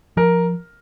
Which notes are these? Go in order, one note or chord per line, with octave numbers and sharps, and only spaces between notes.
F3 A#4